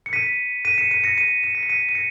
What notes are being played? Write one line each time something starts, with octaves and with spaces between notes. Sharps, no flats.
C#7
B6 D#7
B6 D#7
C#7 E7
B6 D#7
A#6 C#7
B6 D#7
C#7 E7
B6
C#7
B6 D#7
D#7
A#6 C#7